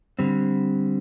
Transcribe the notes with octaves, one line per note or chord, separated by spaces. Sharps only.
D3 G3 C4